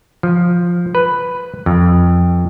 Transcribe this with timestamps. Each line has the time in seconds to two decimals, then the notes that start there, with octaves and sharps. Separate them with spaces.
0.23 F3
0.95 B4
1.66 F2